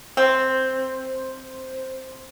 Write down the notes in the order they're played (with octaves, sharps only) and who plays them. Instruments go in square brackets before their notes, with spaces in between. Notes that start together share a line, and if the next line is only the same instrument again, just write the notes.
[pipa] C4 [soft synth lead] C5